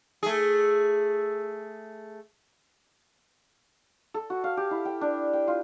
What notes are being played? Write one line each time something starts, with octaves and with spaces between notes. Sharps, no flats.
A3 G#4
A4
F#4
F5
G4
E4
G5
D4
G5
F4